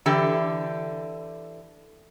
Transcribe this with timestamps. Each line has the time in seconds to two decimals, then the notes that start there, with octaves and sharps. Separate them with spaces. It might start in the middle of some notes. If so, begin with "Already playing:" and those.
0.06 D3 E3 G4